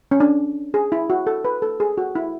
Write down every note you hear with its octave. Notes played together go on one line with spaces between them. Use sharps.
C#4
D4
G#4
E4
F#4
A4
B4
A4
G#4
F#4
E4